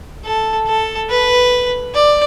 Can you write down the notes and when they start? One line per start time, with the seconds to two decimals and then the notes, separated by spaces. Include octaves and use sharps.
0.25 A4
0.67 A4
1.10 B4
1.95 D5